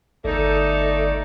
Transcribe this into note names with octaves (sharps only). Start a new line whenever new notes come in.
G1 A3 D#4 A4 D5